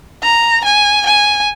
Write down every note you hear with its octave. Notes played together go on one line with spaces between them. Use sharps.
A#5
G#5
G#5